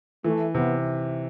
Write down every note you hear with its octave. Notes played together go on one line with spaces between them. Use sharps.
E3 A3
C3 B3